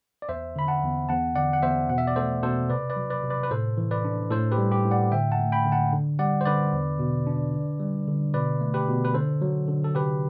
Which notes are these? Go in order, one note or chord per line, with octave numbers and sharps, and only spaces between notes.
D5
E2 C5 E5
D3 B5
F#5 A5
E2
E2 F#5 A5
D3 D5 F#5
F#5
E2 C5 E5
B2 F#5
E5
D5
A3 A4 C5
B2 A4 C5
C3 B4 D5
B4 D5
F#3
B4 D5
C3
B4 D5
B4
A2 A4 C5
E3
B4 D5
D4
A2 A4 C5
G4 B4
G3
G4
A2
D5 F#5
D3 E5 G5
F#5 A5
A3
G5 B5
D3
F#5 A5
D3
G3 D5 F#5
C5
D3 B4 D5
E2
B2
D4
D3
G3
D3
B2 B4 D5
A3
G4 B4
B2
B4
D3 A4 C5
F#3
D3
A4
C3 G4 B4